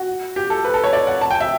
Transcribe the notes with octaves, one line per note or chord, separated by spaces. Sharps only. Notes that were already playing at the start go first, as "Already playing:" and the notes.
Already playing: F#4
G4
A4
B4
A4
C#5
D5
F#5
A5
G5
E5